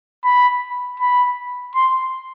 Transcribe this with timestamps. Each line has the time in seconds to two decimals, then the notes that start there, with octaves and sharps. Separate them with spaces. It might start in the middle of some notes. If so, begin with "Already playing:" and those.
0.24 B5
0.99 B5
1.75 C6